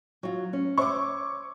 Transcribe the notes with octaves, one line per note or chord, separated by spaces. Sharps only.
F#3 F4
C#4
C5 C#5 E5 C#6 D6